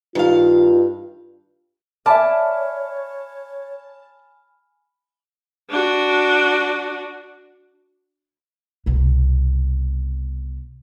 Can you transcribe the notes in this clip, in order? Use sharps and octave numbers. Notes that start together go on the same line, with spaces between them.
G2 D#3 F4 F5
C#5 D5 E5 G#5 A5 B5 F6
D4 F#4
C2 B2